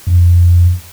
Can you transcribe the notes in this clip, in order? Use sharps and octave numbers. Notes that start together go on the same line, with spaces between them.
F2